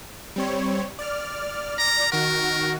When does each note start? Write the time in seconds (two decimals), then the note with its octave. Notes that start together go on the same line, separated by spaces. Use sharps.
0.36 G3 C4 C#5
0.99 D5 F6
1.78 A#5
2.12 D#3 F#4 A#4